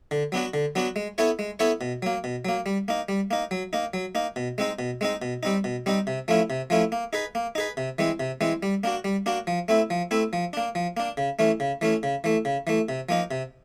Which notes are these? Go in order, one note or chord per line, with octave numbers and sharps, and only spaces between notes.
D3
F#3 B3 D4 F#4
D3
F#3 B3 D4 F#4
G#3
B3 E4 A4 C#5
G#3
B3 E4 A4 C#5
B2
F#3 A#3
B2
F#3 A#3
G3
A#3 D#4
G3
A#3 D#4
F#3
A#3 D#4
F#3
A#3 D#4
B2
G#3 C4 D#4
B2
G#3 C4 D#4
B2
G3 C4 D#4
B2
G3 C4 D#4
C3
F3 A3 C#4 E4
C3
F3 A3 C#4 E4
A#3
D#4 G#4 B4
A#3
D#4 G#4 B4
C3
E3 G#3 C4
C3
E3 G#3 C4
G3
A#3 D4 F#4
G3
A#3 D4 F#4
F3
A3 C4 E4
F3
A3 C4 E4
F3
A#3 D4
F3
A#3 D4
C#3
E3 A3 C#4
C#3
E3 A3 C#4
C#3
E3 A3
C#3
E3 A3
C3
F3 A#3 D#4
C3